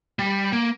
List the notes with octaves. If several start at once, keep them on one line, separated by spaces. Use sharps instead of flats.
G3
A#3